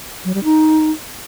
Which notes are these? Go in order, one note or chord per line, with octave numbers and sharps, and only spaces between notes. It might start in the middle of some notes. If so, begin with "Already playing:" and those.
F#3
G3
D#4